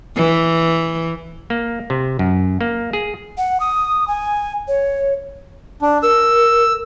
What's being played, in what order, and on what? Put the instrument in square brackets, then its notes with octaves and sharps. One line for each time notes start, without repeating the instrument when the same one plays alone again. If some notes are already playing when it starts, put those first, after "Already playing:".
[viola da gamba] E3
[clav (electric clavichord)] A#3
C3
F#2
A#3
G#4
[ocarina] F#5
D#6
G#5
C#5
[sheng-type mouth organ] D4
[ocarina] A#4 [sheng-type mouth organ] E6